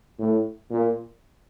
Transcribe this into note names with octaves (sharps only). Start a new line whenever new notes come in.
A2
A#2